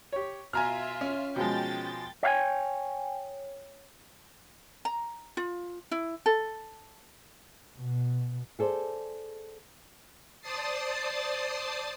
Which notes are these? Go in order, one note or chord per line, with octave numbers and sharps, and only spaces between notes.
G4 C#5
B2 F4 E5 G#5 A#5 F6
C#4
B2 F3 G#3 G5 A6
C#5 E5 F5 G5 G#5
A#5
F4
E4
A4
B2
G#4 A4 C5 D5
C5 D5 A5 D#6 A6 C7